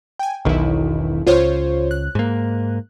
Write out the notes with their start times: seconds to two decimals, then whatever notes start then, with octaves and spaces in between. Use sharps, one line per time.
0.19 G5 G#5
0.45 E1 B1 D#3 E4
1.27 C#2 F4 C5 C#5
1.91 F#6
2.15 G#2 A#3